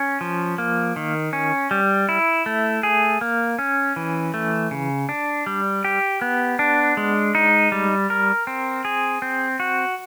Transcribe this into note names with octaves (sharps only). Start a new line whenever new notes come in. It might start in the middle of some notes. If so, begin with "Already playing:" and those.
Already playing: C#4
F3
A#3
D#3
C#4
G3
E4
A3
G#4
A#3
C#4
E3
A3
C#3
D4
G3
G4
B3
D4
G#3
D#4
G3
A#4
C4
G#4
C4
F#4